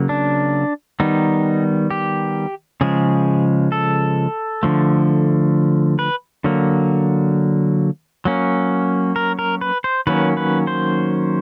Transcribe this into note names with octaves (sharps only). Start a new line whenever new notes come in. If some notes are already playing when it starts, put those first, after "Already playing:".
Already playing: C#3 F#3 A#3
D4
D#3 G3 B3 D#4
G4
C#3 F3 G#3 G#4
A4
D3 F3 A3
B4
D3 F#3 A#3
F#3 A#3 C#4
A#4
A#4
B4
C5
D#3 F#3 A#3 C#4 B4
B4
C5